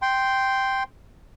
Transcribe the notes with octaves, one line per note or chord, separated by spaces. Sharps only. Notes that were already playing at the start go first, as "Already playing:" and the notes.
G5 C6